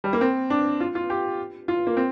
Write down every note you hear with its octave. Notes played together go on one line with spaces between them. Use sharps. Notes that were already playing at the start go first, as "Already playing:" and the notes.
G3
A#3
C4
D4
F4
F4
G4
F4
A#3
C4